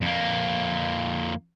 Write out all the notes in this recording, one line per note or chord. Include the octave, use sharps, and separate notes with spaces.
F2 A#3